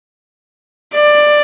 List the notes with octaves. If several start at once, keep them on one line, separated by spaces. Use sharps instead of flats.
D5